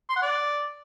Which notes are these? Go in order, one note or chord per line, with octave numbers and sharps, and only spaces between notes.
C6
F#5
D5